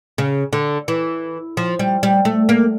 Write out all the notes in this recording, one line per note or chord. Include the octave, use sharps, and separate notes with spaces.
C#3
D3
E3
F3
G3
G3
A3
A#3